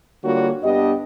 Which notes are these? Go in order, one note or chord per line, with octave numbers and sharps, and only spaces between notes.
D3 G3 A#3 F4 F#4 C#5
G2 B3 D4 G4 D#5